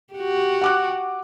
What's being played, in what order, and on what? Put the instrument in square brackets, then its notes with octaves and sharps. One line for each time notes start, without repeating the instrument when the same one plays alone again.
[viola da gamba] F#4 G4
[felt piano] F#5 D6 F#6